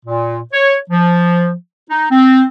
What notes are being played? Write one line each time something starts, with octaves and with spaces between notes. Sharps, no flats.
A#2
C#5
F3
D#4
C4